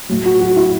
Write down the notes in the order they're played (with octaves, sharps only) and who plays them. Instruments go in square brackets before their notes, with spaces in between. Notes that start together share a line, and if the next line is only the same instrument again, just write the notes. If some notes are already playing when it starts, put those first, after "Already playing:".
[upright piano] A2 F#3
F#4
F#4
E4